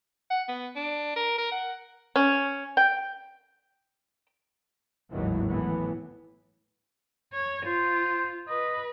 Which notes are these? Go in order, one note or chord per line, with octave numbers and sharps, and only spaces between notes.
F#5
B3
D4
A#4
A#4
F#5
C#4
G5
G#1 D#2 A2 D#3 E3 F#3
A2 E3 B3
C#5
F4 C5
B4 D#5